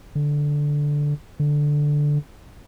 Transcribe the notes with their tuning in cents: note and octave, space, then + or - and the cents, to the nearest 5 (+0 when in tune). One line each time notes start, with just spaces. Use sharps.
D3 -5
D3 +0